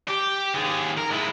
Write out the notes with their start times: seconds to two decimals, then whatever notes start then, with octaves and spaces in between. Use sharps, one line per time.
0.08 G4
0.54 D#2 G#4
0.98 A#4
1.11 G#3 E4